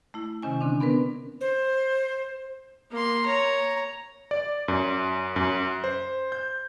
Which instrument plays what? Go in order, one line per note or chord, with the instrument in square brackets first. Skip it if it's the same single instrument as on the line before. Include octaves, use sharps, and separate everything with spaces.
[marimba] A3 E4
C3 D#3 C#4 G#5
D3 C4 D4
B3 D4 A#4 B4
[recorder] C5
[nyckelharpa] A#3 C6
C#5 A#5
[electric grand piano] D5
F#2
F#2
C5
G6